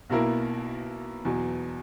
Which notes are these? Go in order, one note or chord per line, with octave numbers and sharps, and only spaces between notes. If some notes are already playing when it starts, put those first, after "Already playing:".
B1 B2 A#3 E4 A#4
E2 B2 F#3